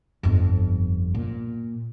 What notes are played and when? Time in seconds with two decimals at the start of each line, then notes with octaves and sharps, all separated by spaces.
0.23 G1 F2
1.14 A#2